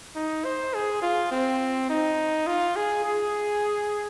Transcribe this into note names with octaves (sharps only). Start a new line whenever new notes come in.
D#4
C5
G#4
F4
C4
D#4
F4
G#4
G#4